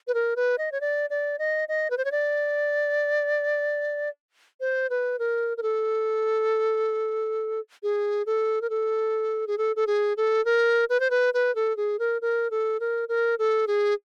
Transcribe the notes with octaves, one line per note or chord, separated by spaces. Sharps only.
B4
A#4
B4
D#5
C#5
D5
D5
D#5
D#5
B4
C5
C#5
D5
C5
B4
A#4
A#4
A4
G#4
A4
A#4
A4
G#4
A4
A4
G#4
A4
A#4
B4
C5
B4
B4
A4
G#4
A#4
A#4
A4
A#4
A#4
A4
G#4